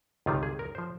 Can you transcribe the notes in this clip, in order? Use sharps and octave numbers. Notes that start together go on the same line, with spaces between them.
C#2 C3 D#3 G3 F4
G#4
A#4
F3 C5